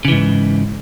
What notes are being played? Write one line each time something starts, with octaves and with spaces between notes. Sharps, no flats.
G#2 C#3 E3